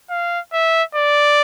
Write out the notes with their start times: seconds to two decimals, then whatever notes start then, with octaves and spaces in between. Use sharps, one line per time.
0.10 F5
0.53 E5
0.95 D5